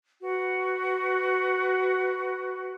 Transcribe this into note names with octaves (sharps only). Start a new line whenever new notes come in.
F#4 B4